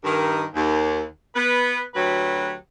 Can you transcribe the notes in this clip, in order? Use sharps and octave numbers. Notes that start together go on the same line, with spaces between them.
G2 D#3
D#2
B3 B4
D2 F#3 G4 B4